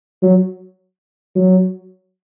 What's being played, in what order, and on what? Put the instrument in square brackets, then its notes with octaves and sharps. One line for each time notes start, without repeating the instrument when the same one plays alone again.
[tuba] F#3
F#3